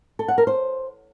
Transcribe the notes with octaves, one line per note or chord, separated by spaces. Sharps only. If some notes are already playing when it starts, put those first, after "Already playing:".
A4
F#5
A#4
C5